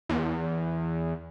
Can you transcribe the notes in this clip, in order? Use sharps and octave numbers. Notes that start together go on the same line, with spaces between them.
E2